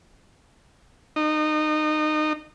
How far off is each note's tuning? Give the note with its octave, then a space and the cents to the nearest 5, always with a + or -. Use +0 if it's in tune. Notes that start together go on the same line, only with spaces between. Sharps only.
D#4 -25